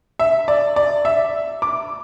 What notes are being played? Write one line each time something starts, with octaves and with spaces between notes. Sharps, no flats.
E5
D5
D5
E5
D6